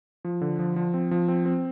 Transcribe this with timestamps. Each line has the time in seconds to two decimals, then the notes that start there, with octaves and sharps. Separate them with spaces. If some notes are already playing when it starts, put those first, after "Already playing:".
0.25 F3
0.41 D3
0.59 F3
0.76 F3
0.94 C4
1.11 F3
1.28 C4
1.46 C4